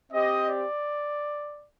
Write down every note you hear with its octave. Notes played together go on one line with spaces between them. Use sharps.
C4 G4 D#5
D5